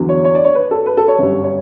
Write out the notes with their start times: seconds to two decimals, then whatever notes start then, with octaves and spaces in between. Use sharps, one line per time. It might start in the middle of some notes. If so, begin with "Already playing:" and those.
Already playing: E2 D3 F#3
0.09 C#5
0.24 C#5
0.35 D5
0.44 C#5
0.55 B4
0.71 A4
0.86 B4
0.97 A4
1.08 C#5
1.18 G1 F#2 D3 G3
1.44 C#5